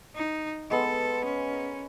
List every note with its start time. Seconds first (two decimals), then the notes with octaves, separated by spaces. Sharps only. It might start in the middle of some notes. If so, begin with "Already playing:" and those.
0.15 D#4
0.70 G#3 B3 A4 C6
1.24 C#4
1.53 A#4